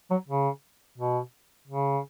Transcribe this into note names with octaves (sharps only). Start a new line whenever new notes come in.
F#3
C#3
B2
C#3